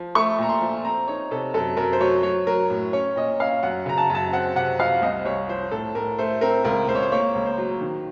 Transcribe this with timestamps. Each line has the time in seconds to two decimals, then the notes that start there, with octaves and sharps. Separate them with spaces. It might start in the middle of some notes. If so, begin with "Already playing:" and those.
Already playing: F3
0.15 A3 C#6
0.38 A#2 A#5
0.49 C6
0.61 F3
0.84 C4 A#5
1.08 D#4 C#5
1.31 C3 A4
1.54 F#2 A4
1.77 F#2 A#4
1.93 C5
2.01 F#3 C#5
2.23 F#3 C#5
2.47 F#3 A#4
2.70 A2
2.93 C#4 C#5
3.16 A#2 D#5
3.40 C#4 F5
3.63 F#2 F#5
3.86 C#3 A#5
3.98 A5
4.10 F#2 A5
4.33 C4 F#5
4.55 C3 F#5
4.79 F3 F5
5.02 C2 D#5
5.25 C2 C#5
5.48 F3 C5
5.71 A2 A4
5.95 A2 A#4
6.18 A3 C5
6.41 C4 A#4
6.64 C#2 A#4
6.88 C#2 C5
6.95 C#5
7.03 C5
7.12 A#3 C#5
7.35 C#2
7.46 C5
7.58 F#3
7.81 D#3